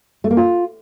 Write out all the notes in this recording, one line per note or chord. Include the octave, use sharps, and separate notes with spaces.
A3
A#3
F4